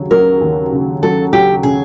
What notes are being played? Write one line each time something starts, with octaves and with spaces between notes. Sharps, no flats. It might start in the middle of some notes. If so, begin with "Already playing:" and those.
Already playing: D#2 C#3 F#3
F#3 A#4
D#2
C#3
F#3 A4
F#3 G4
C#3 G#4